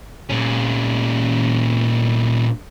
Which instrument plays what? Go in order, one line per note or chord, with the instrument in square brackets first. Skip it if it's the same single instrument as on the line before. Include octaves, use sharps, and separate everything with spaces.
[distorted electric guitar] A#2 C#4